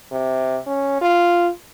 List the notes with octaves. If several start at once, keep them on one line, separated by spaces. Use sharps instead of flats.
C3
C#4
F4